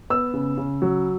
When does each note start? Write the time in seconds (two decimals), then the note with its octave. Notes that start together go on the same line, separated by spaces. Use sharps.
0.10 B3 E6
0.34 C#3
0.58 C#3
0.82 F#3